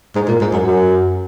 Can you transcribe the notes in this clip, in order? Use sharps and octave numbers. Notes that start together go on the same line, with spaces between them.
G#2
A#2
G#2
F#2
F#2